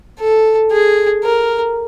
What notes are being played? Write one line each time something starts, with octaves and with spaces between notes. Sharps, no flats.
A4
G#4
A#4